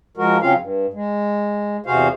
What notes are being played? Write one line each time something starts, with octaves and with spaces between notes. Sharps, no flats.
F3 G#3 F#4 A#4
C#3 F#3 C4 C#4 F4 F5
G2
G#3
E2 C3 F#4 G#4 C5 F5